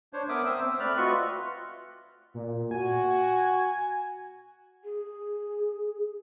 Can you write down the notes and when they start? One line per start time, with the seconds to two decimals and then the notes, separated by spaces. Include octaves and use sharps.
0.13 D4 C5 C#5
0.29 B3 A#4 E5 D6 D#6
0.46 C4 C5 E5 D#6 E6
0.65 C4
0.80 A3 C4 D5 B5 F6 F#6
0.97 F4 F#4 B4 D#5 E5 C#6
2.34 A#2
2.71 F#4 G#5
4.85 G#4